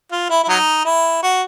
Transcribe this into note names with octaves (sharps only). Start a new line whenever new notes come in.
F4
E4
E4
F#3 D#4
E4
F#4